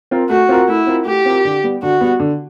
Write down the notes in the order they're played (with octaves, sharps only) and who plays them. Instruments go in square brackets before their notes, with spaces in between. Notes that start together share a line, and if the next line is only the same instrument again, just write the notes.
[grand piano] C4 F4 A#4
[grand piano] A3 [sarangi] F#4
[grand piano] C4 F4 A#4
[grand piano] A3 [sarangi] E4
[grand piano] C4 F4 A#4
[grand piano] A3 [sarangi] G4
[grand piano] C4 F4 A#4
D3
G3 B3
[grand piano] D3 [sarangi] F#4
[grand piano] G3 B3
D3